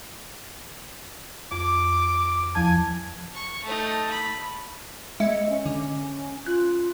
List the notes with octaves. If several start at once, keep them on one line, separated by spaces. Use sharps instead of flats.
F2 D6
E2 F3 G#5 A5
C#6
A3 D#4
B5
G#3 D#5 E5 C#7
C#4
D3
F4 F#6